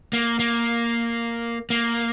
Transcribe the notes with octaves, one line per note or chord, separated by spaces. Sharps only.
A#3
A#3
A#3